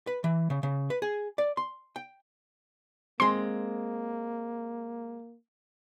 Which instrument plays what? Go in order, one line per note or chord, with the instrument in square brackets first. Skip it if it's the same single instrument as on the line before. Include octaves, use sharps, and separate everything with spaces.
[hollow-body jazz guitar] B4
E3
C#3
C#3
B4
G#4
D5
C6
G5
[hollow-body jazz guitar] G#3 C4 [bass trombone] A#3 [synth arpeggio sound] C6